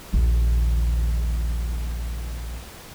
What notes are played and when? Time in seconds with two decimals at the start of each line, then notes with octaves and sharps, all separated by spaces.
0.13 A#1 D#2